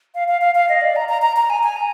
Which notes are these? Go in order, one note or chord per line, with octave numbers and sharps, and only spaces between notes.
F5
F5
F5
F5
D#5
D5
A#5
A#5
A#5
A#5
G#5
G#5
A#5